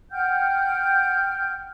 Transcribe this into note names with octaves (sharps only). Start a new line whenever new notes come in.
F#5 G5 F6 G6